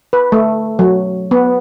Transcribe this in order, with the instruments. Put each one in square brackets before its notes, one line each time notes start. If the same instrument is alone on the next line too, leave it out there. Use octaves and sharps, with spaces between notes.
[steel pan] B4
A3
F#3
B3